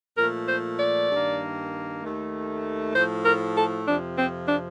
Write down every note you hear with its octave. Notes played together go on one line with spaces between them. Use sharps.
A#2 F3 A3 A#4
C5
D5
G2 D#3 A#3
D#2 D#3 A3
A2 F3 A3 C5
A#4
A4
F2 C3 F3 D4
C4
D4